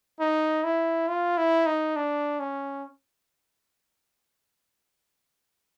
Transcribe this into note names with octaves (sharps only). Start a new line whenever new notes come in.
D#4
E4
F4
E4
D#4
D4
C#4